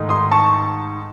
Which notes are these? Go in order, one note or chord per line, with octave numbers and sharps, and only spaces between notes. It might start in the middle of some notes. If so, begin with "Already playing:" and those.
Already playing: G#2 D#3 A3 D#4
C6 D#6
A5 C#6